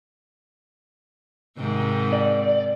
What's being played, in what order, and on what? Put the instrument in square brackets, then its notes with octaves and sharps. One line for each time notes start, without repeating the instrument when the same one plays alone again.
[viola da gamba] G#2 C3 D#3
[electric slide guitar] D5